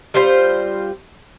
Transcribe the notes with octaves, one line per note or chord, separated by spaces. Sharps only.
G3 C4 F4 C5